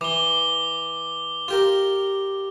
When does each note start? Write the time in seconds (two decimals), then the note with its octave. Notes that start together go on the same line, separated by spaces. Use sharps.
0.01 E3 D6 G7
1.48 F4 G4 A#4